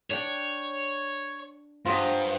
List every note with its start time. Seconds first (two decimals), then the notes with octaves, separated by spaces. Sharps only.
0.11 D4 C#5 G5
1.85 G2 F#3 F4 C5 D#5